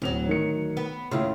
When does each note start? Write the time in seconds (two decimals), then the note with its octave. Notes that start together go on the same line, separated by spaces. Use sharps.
0.02 D1 D2 F#3 F7
0.28 D#3 C#7
0.77 B3
1.11 D#2 A2 C#3 E4 F4